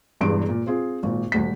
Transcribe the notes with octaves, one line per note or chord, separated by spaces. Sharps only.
E1 E2 G2 C6 D7
A#2
C4 F4 G#4
G#1 A#2
D#1 D2 B6